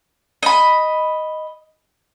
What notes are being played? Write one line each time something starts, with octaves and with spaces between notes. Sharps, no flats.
D#5 B5